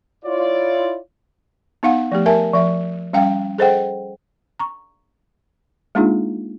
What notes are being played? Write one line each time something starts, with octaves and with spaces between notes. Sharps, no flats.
E4 F4 C#5 D5
B3 D#4 F5 F#5
F3 A3 G4
G4 A#4 E5 G#5 A5
F3 E5
G3 C#4 F5 G5
G#4 A4 C5 D#5 F#5 G5
A#5 C#6
G#3 A#3 D4 D#4 F4 G#4